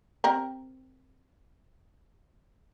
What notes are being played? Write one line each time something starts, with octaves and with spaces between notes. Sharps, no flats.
C4 G4 A#4